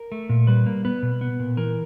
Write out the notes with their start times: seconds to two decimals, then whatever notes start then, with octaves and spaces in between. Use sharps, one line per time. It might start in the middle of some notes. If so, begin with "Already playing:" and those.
Already playing: A#4
0.12 A3
0.29 A#2
0.47 G3 B4
0.66 A#3
0.85 B3 B4
1.03 B2
1.21 B3
1.40 A#2
1.57 E3 A#4